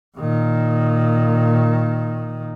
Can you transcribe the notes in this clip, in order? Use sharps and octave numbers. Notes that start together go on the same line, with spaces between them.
A#2 D#3